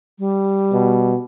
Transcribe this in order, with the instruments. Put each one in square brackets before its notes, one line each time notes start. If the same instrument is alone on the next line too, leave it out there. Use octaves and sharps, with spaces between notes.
[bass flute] G3
[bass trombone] B2